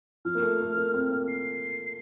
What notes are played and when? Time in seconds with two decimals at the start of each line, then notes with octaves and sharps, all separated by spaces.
0.25 F3 F6
0.35 A#3
0.42 A3
0.60 A3
0.77 A#3
0.94 C4
1.11 A#3
1.28 C7